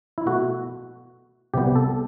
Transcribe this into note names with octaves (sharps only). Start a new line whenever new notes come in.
E4
B2 A3 F#4
C2 C3 G3 B3 G4
A4